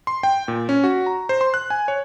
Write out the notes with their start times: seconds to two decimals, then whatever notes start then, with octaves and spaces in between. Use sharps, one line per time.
0.07 C6
0.23 G5
0.48 A#2
0.69 C#4
0.84 F#4
1.06 A#5
1.29 C5
1.41 C6
1.54 F#6
1.70 G#5
1.88 C#5